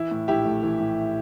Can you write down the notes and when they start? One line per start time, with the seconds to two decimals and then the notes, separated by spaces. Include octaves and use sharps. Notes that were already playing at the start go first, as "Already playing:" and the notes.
Already playing: E3 E4
0.11 A2
0.28 A#1 E4 G4
0.45 A3
0.63 E3
0.80 A2